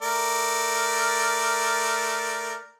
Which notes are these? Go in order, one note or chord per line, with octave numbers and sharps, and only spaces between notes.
A3 A#4 D5